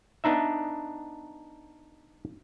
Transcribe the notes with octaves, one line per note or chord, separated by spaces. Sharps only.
B3 D4 D#4 E5